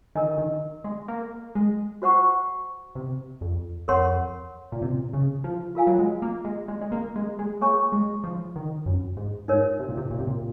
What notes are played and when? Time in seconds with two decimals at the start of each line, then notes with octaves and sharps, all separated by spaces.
0.15 D#3 A#4 D#5 G#5
0.38 D#3
0.84 G#3
1.08 A#3
1.55 G#3
2.02 F#4 C5 F#5 C#6
2.95 C3
3.41 F2
3.88 F2 A#4 C#5 F#5 C6
4.72 A#2
4.82 C3
5.13 C#3
5.44 F3
5.75 F4 A#4 F5 G#5
5.87 F#3
5.99 G#3
6.22 A#3
6.45 G#3
6.68 G#3
6.81 G#3
6.92 A#3
7.16 G#3
7.39 G#3
7.61 A#3 G#4 C#5 G#5 C#6
7.92 G#3
8.24 F3
8.56 D#3
8.86 F#2
9.17 G#2
9.48 G#2 D#4 A#4 C#5
9.79 C3
9.89 A#2
9.97 C3
10.11 A#2
10.19 C3
10.27 A#2